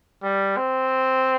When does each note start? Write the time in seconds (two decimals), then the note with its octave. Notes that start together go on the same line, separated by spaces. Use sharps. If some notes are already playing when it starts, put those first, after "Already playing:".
0.23 G3
0.57 C4